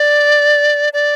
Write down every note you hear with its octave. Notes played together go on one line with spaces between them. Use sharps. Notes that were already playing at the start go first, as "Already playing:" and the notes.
Already playing: D5
D5